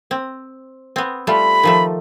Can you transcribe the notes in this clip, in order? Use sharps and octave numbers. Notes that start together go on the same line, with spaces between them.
C4
B3 C4
G3 A3 F4 B5
D#3 F3 A3